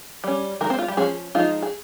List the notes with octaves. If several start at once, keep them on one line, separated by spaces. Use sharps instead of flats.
G3 C#4
D#3 G#3 A#4
C4 C5
F4
G3 G4
F3 G#3 C#4 G#4
F3 G#3 D#4 F4
G#4